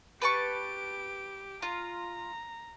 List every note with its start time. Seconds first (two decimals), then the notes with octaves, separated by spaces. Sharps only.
0.22 G4 B4 A5 C#6 D7
1.62 F4 A#5